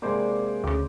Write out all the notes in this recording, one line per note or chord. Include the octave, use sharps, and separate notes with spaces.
C3 G#3 A#3 C5 D5
D2 C#3 D6